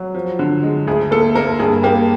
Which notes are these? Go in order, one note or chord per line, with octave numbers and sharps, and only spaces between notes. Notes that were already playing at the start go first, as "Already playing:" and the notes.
Already playing: F#3
F3
D3
G#3
D2 G#4
A#3 A4
A#3 A#4
G2 G#4
A#3 G4